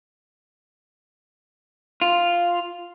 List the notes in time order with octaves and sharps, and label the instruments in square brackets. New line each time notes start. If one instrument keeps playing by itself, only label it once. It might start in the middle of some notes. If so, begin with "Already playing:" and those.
[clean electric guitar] F4